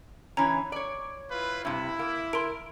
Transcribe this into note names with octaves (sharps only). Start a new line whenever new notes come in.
E3 C#4 A#5
C#5 D5
E4 F4 B4
G2 C3 E4
A#3
A#4 C6 D7